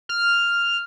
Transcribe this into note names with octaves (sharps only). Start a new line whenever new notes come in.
F6